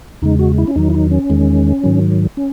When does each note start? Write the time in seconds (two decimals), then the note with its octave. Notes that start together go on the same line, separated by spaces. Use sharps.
0.22 E2 C#3 G#3 D#4
0.39 F#4
0.58 E4
0.67 C#4
0.76 E2 D#3 F#3 D#4
0.90 E4
0.94 D#4
1.11 C#4
1.30 E2 D#3 G#3
1.84 G#2 D#3 F#3
2.37 C#4